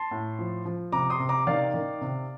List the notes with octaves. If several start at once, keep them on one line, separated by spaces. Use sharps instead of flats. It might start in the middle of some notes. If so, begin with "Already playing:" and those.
Already playing: A5 C6
A2
F3
F3
C3 A#5 D6
C6 D#6
C3
A#5 D6
D#3 D5 F5
D#3
C3